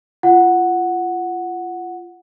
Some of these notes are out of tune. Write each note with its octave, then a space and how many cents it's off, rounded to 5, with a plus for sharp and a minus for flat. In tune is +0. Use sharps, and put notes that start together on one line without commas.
F4 -25 F#5 -5